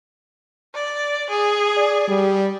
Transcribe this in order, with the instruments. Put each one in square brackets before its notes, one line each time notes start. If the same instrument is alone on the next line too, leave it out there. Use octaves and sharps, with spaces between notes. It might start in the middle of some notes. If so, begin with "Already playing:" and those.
[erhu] D5
G#4
[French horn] D5
G3